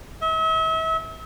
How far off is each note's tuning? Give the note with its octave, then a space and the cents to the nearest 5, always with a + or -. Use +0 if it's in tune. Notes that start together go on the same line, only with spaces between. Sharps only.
E5 -40